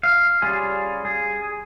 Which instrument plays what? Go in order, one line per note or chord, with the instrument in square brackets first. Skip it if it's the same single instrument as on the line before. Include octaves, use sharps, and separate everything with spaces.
[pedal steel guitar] F5
G3 C#4 F4 G#4
G#4